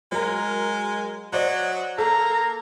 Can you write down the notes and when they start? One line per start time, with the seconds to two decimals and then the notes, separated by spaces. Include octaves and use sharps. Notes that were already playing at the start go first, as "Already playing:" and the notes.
0.12 F#3 G#3 A#4 A#5
1.33 F#3 C5 D5 D#5
1.98 A#3 A4 A#5